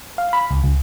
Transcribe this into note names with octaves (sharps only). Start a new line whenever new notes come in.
F5
B5
C#2
C#2